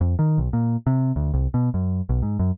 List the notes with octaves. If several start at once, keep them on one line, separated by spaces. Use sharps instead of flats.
F2
D#3
B1
A#2
C3
D2
C2
B2
F#2
B1
G#2
F#2